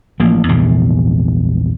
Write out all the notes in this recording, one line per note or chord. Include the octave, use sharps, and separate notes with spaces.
A1 F3 A#3
A#1 E2 G#2 C3